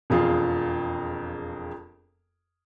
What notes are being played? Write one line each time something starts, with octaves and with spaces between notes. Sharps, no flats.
E1 F2 F4 G#4